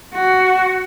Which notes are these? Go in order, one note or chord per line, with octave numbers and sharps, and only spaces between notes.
F#4